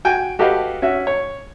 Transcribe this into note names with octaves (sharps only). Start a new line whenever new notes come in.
F#4 G5 G#5
F#4 G4 A4 B4 D#5 F5
C#4 F#4 E5
C#5